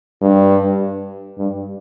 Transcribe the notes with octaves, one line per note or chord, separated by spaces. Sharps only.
G2
G2